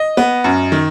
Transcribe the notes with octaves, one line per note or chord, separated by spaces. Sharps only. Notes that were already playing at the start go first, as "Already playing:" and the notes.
Already playing: D#5
B3
F#2
D#3